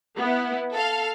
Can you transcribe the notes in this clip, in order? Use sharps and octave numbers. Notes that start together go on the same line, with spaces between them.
B3 E4
A4 F5